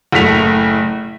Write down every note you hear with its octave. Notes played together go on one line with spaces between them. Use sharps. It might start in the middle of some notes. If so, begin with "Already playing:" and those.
F#1 A2 A3 B6 F7